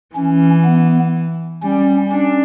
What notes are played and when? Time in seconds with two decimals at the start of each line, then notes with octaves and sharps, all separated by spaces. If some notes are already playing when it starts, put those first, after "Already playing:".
0.15 E3 C#4
0.65 B3
1.63 G3 C#4
2.11 C#4 D4